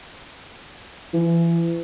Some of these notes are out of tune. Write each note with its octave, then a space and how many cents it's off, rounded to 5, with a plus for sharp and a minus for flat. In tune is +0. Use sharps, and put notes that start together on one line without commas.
E3 +35